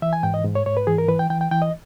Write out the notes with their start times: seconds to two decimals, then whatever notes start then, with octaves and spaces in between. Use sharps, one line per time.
0.02 E3 E5
0.13 G#5
0.23 G#2 G5
0.34 D#5
0.45 G#2
0.55 C#5
0.66 G#2 C#5
0.77 B4
0.87 E3 G#4
0.98 A#4
1.08 E3 B4
1.19 G5
1.30 E3 G5
1.41 G5
1.51 E3 G5
1.62 D#5